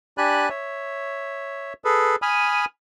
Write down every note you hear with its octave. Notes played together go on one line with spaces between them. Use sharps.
D4 G4 D5 G#5 B5 F#6
C#5 E5
G#4 A4 B4
G#5 B5 D#6 F6